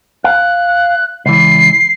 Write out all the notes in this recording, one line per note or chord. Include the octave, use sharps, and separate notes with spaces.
F5 F#6
C#2 E3 C7